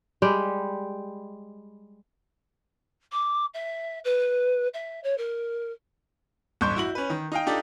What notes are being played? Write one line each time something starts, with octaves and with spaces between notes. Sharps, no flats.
G3 G#3 G4
D6
E5
B4
E5
C#5
A#4
A1 G2 C6 C#6 G6
E4 F#4 F#7
C#4 B4
D#3
D#4 F5 G5
D4 D#4 F4 G4 A4 D5